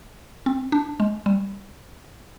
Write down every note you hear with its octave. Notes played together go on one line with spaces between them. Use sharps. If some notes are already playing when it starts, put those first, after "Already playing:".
C4
D4
G#3
G3